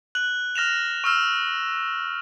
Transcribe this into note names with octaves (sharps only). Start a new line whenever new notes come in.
F#6 F#7
F6 A#6 E7 F7
C#6 E6 F6 E7